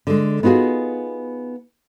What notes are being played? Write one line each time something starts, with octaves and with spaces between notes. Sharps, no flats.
D3 G#3
B3 D#4 F4 F#4 G#4